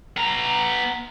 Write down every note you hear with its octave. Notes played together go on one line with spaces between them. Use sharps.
B3 A#5